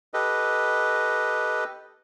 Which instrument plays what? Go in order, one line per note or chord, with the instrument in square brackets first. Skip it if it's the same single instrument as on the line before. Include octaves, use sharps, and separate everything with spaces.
[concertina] G4 A4 B4 D#5